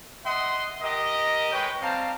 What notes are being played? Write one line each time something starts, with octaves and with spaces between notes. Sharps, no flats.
D#5 E5 F#5 C6 D#6
G4 A#4 D#5
G#3 B4 C#5 G5
G3 C4 F5 A5 A#5